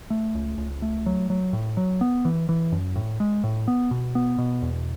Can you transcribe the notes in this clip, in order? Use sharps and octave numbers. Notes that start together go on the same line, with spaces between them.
A3
C#2
C#2
A3
F#3
F#3
A2
F#3
B3
E3
E3
F#2
A2
G#3
A2
B3
B2
B3
B2
E2